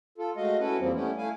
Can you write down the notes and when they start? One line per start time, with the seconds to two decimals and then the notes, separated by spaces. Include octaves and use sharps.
0.18 F4 A4
0.37 G#3 A3 F#4 D#5 F5
0.59 C#4 E4 F#4 A4 B4
0.79 F2 E3 F3 G3 A#3 C4
0.94 G3 A3 B3 C#4 E4
1.17 A3 E4 F5 G#5